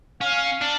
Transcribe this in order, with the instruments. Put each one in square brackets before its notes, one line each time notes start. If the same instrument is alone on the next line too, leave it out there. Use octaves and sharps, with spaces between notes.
[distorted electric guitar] C#4 [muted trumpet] F5
[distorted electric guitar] D4